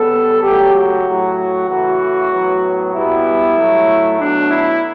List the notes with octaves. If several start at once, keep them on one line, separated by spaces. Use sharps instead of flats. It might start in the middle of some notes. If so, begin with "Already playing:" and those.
Already playing: C#3 G3 B3 A4
C#3 F#3 A3 G4
F#4
A2 F#3 A3
C#3 E3 A3 F#4
A2 F#3 B3
B2 G3 B3 E4
A2 F#3 A3
B2 F#3 A3 D4
E4